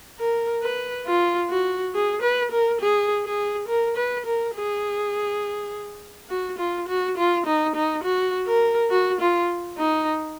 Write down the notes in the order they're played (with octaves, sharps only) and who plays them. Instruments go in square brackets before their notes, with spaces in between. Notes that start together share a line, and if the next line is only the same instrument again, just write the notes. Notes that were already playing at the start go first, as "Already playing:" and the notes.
[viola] A#4
B4
F4
F#4
G#4
B4
A#4
G#4
G#4
A#4
B4
A#4
G#4
F#4
F4
F#4
F4
D#4
D#4
F#4
A#4
F#4
F4
D#4